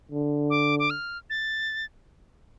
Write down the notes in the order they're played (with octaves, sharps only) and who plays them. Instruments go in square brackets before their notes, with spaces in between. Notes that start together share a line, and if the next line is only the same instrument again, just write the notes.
[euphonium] D3
[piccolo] D6
D6
F6
A6